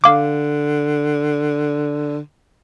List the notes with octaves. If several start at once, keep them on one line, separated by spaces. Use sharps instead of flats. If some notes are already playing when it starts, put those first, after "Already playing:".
D3 F5 D6